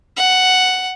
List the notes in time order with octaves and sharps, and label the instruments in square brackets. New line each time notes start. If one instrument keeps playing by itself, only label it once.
[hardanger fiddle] F#5